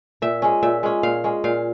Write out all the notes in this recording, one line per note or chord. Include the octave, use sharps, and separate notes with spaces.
A#2 E5
G#3 C#4
A#2 E5
G#3 C#4
A#2 F5
G#3 C#4
A#2 F5